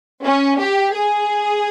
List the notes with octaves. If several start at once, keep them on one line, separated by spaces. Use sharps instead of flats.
C#4
G4
G#4